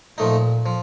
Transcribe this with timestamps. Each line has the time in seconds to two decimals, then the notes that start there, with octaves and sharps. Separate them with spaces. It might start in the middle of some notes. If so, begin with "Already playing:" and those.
0.17 A#2 F3 A3 D#4
0.66 F3